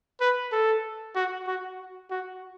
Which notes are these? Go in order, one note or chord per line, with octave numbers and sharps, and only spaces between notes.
B4
A4
F#4
F#4
F#4